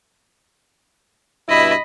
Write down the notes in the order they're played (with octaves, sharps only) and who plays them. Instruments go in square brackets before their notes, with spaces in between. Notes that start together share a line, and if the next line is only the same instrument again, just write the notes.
[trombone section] G2 B2 E4 [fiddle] D#5 B5